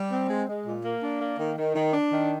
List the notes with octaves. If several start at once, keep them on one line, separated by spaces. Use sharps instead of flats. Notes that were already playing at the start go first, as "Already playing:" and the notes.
Already playing: G3
C4
G#3
G#3
A#2
A#3
D4
A#3
D#3
D#3
D#3
D4
D#3